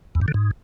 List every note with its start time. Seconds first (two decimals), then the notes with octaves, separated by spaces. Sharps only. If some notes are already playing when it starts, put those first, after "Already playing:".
0.15 E2
0.21 G2
0.28 D3
0.34 G#2